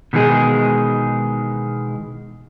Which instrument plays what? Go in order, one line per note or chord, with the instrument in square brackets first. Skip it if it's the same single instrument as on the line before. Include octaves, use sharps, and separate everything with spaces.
[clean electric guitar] B2 D#3 E3 G#3 G#4